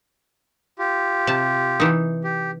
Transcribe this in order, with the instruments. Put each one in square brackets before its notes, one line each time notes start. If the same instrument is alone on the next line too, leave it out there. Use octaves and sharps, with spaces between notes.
[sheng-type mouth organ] F4 G4
[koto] C3 A5
E3 D#4
[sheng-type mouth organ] G4